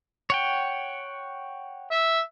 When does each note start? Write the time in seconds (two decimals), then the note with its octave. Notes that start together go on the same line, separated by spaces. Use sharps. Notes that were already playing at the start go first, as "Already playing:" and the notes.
0.30 C#5 F#5 G5
1.91 E5